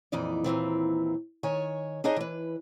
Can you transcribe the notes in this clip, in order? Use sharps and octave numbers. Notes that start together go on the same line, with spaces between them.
F2 A#2 E3 D#4 D5
D#2 A#2 E3 C4
D#3 C#5 G#5
D4 D#4 G#4 C#5 D#5
E3 B4